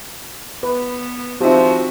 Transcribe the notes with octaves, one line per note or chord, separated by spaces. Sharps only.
B3 B4
F3 C4 D#4 F#4 G4 E5